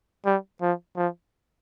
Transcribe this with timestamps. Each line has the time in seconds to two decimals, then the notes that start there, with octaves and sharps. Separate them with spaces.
0.26 G3
0.62 F3
0.97 F3